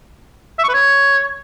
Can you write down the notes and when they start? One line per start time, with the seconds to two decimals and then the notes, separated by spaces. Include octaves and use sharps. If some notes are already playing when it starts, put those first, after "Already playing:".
0.59 E5
0.64 C#6
0.69 B4
0.74 C#5